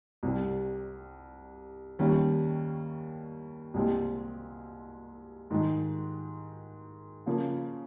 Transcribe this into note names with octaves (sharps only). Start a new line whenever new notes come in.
C2 C3 G3 C4
D#2 D#3 G3 C#4
C2 A#2 G#3 C4 G4
G#2 D#3 G#3
C#3 F3 A#3 F4